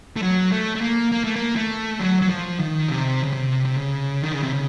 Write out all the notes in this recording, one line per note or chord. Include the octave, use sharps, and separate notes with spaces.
A3
F#3
A3
A3
A#3
A#3
A3
A#3
A3
F#3
F#3
F3
D#3
C3
C#3
C3
C3
C#3
D#3
C#3
C3
C#3